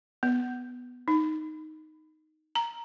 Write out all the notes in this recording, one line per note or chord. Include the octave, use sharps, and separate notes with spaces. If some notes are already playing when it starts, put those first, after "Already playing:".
B3
D#4
A#5